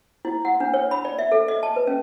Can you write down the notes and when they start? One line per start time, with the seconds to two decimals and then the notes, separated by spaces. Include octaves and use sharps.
0.25 E4
0.45 F#5
0.60 D4
0.74 C#5
0.91 B5
1.05 D5
1.19 E5
1.32 A4
1.48 D#5
1.63 A5
1.76 B4
1.87 C#4